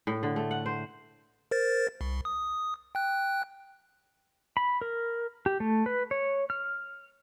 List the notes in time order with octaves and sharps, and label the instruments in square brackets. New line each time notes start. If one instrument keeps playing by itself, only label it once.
[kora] A2
D3
A3
F#5
C5
[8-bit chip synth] A#4 C5 A6
C2
D#6
G5 F#6
[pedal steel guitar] B5
A#4
G4
A3
B4
C#5
F6